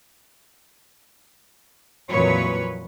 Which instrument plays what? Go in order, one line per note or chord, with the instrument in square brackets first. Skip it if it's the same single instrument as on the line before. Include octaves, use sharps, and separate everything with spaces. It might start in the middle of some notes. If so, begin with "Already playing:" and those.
[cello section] F2 A#2 E3 F#3 B4 C#5